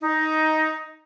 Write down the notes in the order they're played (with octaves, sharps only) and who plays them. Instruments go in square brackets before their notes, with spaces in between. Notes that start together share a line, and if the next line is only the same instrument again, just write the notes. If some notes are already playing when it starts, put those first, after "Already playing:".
[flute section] D#4